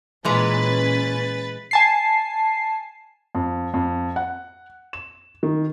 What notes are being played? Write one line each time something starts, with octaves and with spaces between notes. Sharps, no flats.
A#2 E3 G#3 C#4 B4 G#5 A#5 A6
G#5 A5 C7
F2
F2
F#5
E7
D#3